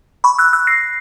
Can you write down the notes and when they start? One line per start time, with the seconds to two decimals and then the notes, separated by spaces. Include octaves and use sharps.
0.24 B5 C#6
0.38 E6 F#6
0.53 E6 F#6
0.67 A#6 C7